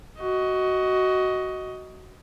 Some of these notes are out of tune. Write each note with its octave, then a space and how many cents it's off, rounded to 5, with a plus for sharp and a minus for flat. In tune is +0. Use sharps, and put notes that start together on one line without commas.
F#4 +10 D#5 +15